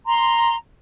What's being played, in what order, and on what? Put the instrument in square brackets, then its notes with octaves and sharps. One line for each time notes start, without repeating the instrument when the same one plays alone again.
[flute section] A#5 C6